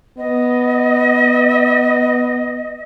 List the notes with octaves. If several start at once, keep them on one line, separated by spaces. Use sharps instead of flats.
B3 D#5